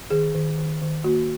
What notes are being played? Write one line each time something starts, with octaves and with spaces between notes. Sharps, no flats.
D#3 G#4
D#3
D#3
D#3
A#3 F#4